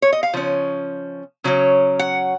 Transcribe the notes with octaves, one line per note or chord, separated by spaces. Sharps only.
C#5
D#5
F5
C#3 F3 C#4
C#3 F#3 C#4
F#5